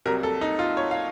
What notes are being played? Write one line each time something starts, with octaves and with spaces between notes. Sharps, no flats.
C2 C3 F#3 A#4
A4
D#4
F4
C#5
F5